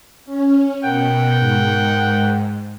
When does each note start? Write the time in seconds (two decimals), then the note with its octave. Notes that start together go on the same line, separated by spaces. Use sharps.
0.26 C#4
0.84 B2 A#4 F#5 G5
1.39 G#2